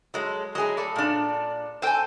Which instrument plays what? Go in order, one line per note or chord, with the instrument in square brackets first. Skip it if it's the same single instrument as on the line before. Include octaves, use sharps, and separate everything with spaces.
[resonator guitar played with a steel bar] F#3 G#3 [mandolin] A4
[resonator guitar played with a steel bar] F#3 G#4 [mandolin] E4 D#5
[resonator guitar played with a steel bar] A3 [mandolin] A4 D5
[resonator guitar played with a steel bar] A#2 D4
[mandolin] C4 A4 G5 [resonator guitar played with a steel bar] C5 G#5